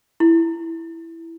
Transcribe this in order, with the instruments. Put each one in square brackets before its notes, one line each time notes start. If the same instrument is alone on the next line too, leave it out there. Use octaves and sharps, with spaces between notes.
[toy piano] E4